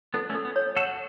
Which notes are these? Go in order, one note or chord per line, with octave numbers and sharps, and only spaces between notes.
B3 D4 A4
A3 C#4
A4
B3
C#5
F#4 A4 F#5